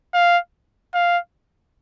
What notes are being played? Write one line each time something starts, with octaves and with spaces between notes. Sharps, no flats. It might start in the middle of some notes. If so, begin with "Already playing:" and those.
F5
F5